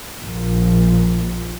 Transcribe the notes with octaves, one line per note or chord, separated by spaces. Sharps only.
A#1 A#2 F3